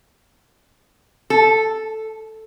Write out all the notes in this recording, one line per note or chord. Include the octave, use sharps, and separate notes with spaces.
A4